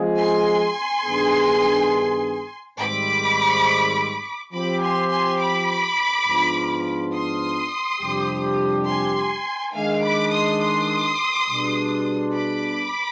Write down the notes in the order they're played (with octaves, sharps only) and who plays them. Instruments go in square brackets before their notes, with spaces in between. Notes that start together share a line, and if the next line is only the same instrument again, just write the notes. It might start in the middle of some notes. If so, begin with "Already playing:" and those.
Already playing: [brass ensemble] F3 G#3 C4 F4 G#4
[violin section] G#5 C6
[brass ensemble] G2 D#3 B3 D4 G#4
[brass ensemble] G#2 D#3 G3 C4 [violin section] B5 D6
[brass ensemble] F3 C4 G4 [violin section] B5 D6
[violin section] G#5 C6
G#5 C6
B5 D6
[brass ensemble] G#2 F3 B3 D4 F4
[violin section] C6 D#6
[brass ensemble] F2 C3 G3 D4 G4
[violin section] G#5 C6
[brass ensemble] D#3 G#3 D4 [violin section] F5 G#5
[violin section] B5 D6
C6 D#6
C6 D#6
[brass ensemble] B2 G3 D4 G#4
[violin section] B5 D6